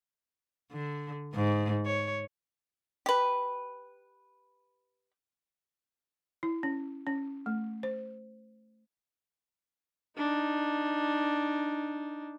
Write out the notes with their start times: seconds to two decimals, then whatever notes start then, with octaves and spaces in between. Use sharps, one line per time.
0.72 D3
1.34 G#2
1.86 C#5
3.06 G4 B4
6.43 E4
6.63 C#4
7.07 C#4
7.46 A3
7.83 C5
10.17 D4 D#4